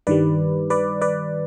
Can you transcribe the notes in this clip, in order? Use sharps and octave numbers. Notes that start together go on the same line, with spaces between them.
G2 D#3 G3 B4 D5
B4 D5
B4 D5